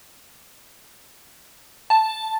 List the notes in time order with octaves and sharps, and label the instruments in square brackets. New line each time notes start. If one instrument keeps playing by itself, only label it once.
[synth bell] A5